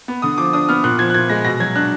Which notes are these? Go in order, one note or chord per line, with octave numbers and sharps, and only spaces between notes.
B3
D3 D#6
F3 D6
D4 D#6
B3 F6
A#2 F#6
F3 G#6
F#6
A#2 G#6
G#3 A#6
B2 A#6
F#3 G#6
D4 F#6